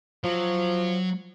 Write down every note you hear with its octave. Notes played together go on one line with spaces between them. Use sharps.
F3 F#3